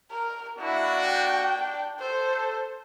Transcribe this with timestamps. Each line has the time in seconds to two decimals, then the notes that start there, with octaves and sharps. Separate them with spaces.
0.11 A#4
0.58 A#3 D4 E4 F#4
1.04 G5
1.55 D4
2.00 A4 C5